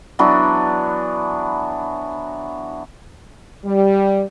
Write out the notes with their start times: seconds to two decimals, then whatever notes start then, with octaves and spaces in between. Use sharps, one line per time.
0.19 E3 F#3 B3 D4
3.65 G3